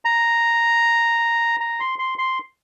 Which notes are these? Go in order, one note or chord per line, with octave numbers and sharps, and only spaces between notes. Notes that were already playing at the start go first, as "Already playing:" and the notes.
A#5
A#5
C6
C6
C6